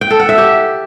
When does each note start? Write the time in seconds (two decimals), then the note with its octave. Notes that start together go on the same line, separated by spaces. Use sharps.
0.01 G5
0.10 A4
0.20 F#5
0.29 E5
0.38 G4